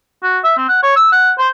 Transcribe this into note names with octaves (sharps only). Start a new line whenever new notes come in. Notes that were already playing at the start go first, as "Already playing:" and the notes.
F#4
E5
C4
F#5
C#5
E6
F#5
C5